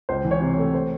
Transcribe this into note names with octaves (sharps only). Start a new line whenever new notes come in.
C#2 C5
E3
C#5
C3
A3
C5